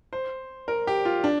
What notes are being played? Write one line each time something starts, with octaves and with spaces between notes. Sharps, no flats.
C5
A#4
G4
F4
D4